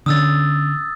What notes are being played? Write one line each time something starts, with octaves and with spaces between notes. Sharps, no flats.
D3 B3 C#4 D#6 E6 A6